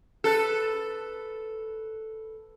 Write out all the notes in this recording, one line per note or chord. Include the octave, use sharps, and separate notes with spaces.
A4 B4